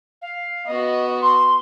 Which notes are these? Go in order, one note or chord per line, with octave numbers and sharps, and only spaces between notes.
F5
B3 F#4 D#5
C6